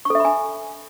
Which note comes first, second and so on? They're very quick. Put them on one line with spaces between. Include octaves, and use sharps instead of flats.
C#6 A4 E5 B5 G#5